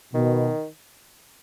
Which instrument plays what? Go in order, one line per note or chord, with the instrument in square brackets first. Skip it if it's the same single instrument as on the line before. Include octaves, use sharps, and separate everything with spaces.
[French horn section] B2 [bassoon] D#3